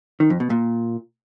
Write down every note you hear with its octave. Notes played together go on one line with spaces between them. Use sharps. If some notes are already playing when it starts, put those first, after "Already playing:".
D#3
F2
B2
A#2